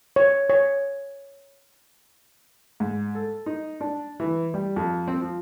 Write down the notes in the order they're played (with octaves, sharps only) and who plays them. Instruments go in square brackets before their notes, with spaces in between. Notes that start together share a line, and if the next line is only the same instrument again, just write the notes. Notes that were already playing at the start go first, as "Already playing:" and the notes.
[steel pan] C#5
C#5
[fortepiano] G#2
A4
D#4
D4
E3
G3
F2
C4
F3